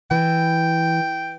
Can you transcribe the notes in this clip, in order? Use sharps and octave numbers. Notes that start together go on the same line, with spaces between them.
E3 G5